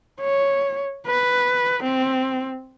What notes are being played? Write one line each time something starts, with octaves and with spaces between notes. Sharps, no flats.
C#5
B4
C4